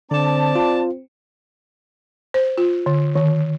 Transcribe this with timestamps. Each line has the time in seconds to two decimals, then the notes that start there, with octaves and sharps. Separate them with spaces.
0.11 D3 C4 D5 A5
0.55 F4
2.34 C5
2.58 F4
2.86 D3
3.15 D#3